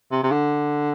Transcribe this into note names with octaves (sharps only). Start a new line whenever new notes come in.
C3
C3
D3